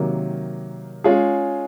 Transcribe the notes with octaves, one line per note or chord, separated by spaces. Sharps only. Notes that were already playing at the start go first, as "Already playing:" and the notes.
Already playing: C3 D#3 F#3 A#3
G#3 C#4 F4 G#4